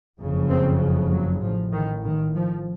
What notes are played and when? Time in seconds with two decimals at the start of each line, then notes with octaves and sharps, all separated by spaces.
0.18 F#1 F2 C#3
0.49 C4
1.11 F#3
1.41 A1 A2 F3
1.73 D#3
2.04 D#3
2.36 F3